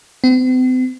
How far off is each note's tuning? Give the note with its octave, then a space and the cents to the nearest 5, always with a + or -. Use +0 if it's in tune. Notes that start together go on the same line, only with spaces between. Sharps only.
C4 -45